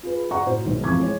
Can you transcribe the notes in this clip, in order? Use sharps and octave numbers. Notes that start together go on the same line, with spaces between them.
F4 G#4 B4
D5 F#5 A#5 C#6
A2 F#4 C5
B1 G#2 D#3
F2 E3 F3 C#6 D6 G#6
G#3 C#5